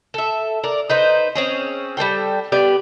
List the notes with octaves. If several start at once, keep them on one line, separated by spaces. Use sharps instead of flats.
A4 E5
A#4 D5
D#4 B4 C5
C4 C#4 G#4
G3 C4 A4 G5
B3 G4 D5